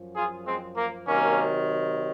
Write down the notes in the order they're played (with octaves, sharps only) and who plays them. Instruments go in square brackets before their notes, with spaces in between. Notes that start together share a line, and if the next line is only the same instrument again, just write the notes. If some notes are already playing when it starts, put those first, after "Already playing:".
Already playing: [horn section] F#2 F3
F4 G#4
G#3 C4
A#3
C3 D#3 F#3 A#3 C#4